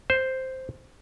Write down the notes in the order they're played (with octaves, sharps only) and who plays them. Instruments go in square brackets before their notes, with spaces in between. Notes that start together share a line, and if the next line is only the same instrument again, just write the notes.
[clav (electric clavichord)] C5